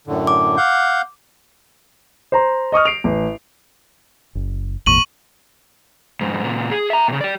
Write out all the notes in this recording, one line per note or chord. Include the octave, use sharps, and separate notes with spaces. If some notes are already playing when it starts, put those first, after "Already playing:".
F#2 A2 D3
D6
F5 F#5 G6
C5 A#5 C6
D#5 C#6 D#6 F6
C7 D7 F7
A1
F#1
G#1 E2 A#2 C#6 D#7 F#7
F2 G#2
A#2 C#3
G#4
E5 A#5
A#2 C#3
G4 D5